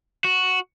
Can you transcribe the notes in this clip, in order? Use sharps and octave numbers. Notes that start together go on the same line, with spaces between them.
F#4